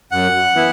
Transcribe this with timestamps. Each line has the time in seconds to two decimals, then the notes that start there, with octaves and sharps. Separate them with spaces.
0.11 F#2 F#5
0.55 E3 B3 E4